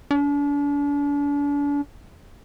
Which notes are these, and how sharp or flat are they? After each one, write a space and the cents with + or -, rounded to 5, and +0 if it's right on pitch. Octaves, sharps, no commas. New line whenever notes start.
D4 -40